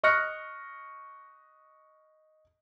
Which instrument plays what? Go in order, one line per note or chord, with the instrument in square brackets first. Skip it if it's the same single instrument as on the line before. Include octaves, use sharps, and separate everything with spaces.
[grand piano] D#5 C#6 F6 F#6 A#6 C#7